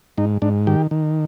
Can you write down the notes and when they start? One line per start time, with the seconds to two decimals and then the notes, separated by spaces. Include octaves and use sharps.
0.18 G#2 D#4
0.42 G#2 D4
0.67 D#3 G4
0.91 D#3